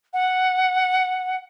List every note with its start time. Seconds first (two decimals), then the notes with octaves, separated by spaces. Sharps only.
0.13 F#5